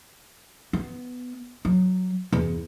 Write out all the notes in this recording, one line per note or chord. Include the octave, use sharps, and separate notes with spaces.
B3
F#3
E2